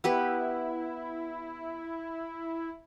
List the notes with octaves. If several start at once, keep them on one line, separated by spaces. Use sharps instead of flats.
B3 E4 G4 B4